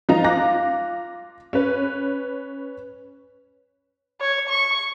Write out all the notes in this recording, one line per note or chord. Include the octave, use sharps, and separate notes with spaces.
F3 D#4 F5 A#5
F4 D6 F#6 A#6
C#4 B4
C#5
C#6